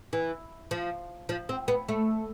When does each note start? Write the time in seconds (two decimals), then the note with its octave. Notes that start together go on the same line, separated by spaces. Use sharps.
0.13 E3
0.71 F3
1.29 F3
1.49 C4
1.68 B3
1.89 A3